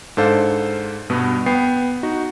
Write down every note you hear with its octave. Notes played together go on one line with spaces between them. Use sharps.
G#2 D4 A4 C5 F5
G2 B2 B3
B3 G5 C7
D#4 F#4